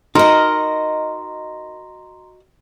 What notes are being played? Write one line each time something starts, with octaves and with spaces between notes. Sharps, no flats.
D#4 F#4 A#4 D#5 A#5 C6